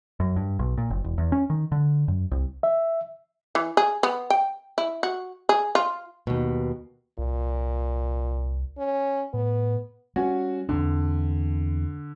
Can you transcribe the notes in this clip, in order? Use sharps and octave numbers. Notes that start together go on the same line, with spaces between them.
F#2
G2
B1
A#2
F#1
E1
E2
C#4
D#3
D3
F#2
C2
E5
E3
G#4
B3
G5
E4
F#4
G#4
F4
D#2 B2
C2 A#2
C#4
A2 B3
G3 C#4 F#4
E2 D3 C4 D4